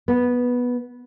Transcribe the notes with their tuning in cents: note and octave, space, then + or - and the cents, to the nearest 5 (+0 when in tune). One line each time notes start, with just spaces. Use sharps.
B3 -10